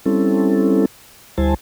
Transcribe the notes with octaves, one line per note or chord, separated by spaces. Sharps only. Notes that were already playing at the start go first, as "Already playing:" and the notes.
G3 C4 C#4 E4 A4
D2 G3 E4 C5 G#5 A5